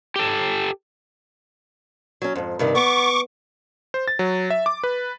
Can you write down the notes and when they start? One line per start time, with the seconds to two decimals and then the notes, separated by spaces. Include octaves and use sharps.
0.16 G4 A4
2.22 F#3 C#4
2.36 F2 G#2
2.59 G2 C3 D#3
2.75 B3 C#6 D6
3.94 C5
4.08 A6
4.19 F#3
4.50 E5
4.66 D6
4.84 B4